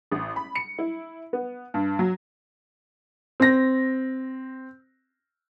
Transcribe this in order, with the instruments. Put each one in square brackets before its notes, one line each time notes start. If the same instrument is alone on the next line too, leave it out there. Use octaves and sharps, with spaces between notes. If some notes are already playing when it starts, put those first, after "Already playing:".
[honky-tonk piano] A1
B5
C#7
E4
B3
G2
F#3
[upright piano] C4 A#6